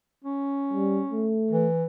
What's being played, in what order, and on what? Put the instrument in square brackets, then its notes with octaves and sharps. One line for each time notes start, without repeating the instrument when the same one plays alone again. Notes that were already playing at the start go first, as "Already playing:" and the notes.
[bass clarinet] C#4
[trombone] G3
A3
[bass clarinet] E3